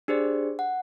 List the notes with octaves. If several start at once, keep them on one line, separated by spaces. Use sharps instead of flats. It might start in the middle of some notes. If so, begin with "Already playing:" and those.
D4 G4 G#4 C5 D5
F#5